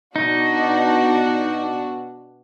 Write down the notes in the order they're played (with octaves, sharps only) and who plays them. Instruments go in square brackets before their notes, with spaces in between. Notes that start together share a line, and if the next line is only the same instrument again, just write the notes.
[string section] B2 D4 F#4 [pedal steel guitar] D#4